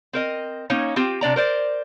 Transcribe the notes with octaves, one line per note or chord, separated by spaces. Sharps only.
C4 A#4 D#5
A#3 C#4 D#4 C#5
C4 F4 G4
C3 D4 D5 A#5
A#4 C5 D5